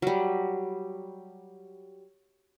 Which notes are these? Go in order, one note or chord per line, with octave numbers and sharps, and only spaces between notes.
F#3 G3